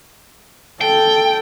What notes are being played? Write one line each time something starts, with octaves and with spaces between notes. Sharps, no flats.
A4 G5